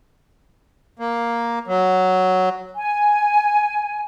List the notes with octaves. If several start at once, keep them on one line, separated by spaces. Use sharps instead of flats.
A#3
F#3
G#5